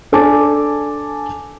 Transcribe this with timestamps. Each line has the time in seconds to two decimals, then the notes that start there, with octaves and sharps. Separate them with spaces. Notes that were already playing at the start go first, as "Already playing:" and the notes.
0.12 D4 A4 G#5 A5 D6